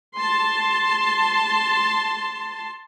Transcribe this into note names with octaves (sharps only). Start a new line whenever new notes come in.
A5 C6